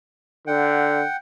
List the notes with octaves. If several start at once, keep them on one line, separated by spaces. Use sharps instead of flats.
D3 F#5 G5